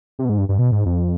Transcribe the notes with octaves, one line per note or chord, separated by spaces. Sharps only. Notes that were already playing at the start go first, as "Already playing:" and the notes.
C3
B2
G#2
G2
G2
B2
G#2
F2